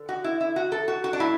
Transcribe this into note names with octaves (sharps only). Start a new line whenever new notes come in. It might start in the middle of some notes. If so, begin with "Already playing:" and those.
Already playing: D3
F#4
E4
E4
F#4
A4
F#4
F#4
D4
A2 E4